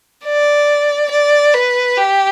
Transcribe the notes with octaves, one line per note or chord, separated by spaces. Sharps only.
D5
D5
B4
G4